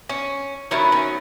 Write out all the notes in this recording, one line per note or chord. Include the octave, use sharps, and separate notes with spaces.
C#4
D#3 F#3 B3 C#4 E4
C#4